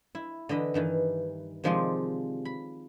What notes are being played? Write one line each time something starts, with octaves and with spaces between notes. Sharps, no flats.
E4
D3 E3 D#5 B5
G2 D#3 E3
C3 D#3 F3 G#3 D5 C6
B5